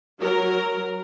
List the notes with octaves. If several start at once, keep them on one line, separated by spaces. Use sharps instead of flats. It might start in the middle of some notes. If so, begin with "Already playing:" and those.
F#3 A#4